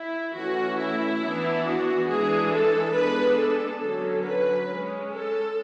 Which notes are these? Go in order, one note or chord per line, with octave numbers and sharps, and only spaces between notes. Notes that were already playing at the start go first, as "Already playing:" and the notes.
Already playing: E4
E3 A3 C#4 F#4
E4
E3 B3 D4
F#4
E3 G#3 D4 G#4
A4
G#3 B3 D4 B4
A4
D3 F#3 C#4 A4
B4
G#3 C#4
A4